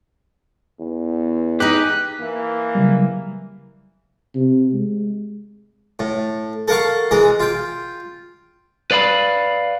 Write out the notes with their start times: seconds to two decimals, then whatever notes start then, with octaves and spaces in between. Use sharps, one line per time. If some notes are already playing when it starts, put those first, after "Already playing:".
0.79 E2
1.60 D#4 G4 G#4 B4 F#6
2.20 E3 A#3
2.75 C#3 F#3 G3
4.35 C3
4.74 G#3
5.99 A2
6.68 A4 A#4 F5 F#5 C#6
7.11 E3 G#3 A#4
7.40 F4 G5
8.91 B4 D5 F5 B5